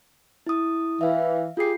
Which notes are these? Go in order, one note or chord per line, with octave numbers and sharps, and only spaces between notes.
E4 D#6
E3 E5 F5
F4 G4 G#4 C7